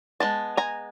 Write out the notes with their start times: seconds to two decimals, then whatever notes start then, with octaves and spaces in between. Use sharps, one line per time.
0.20 G#3 B3 A5
0.57 G#5 A#5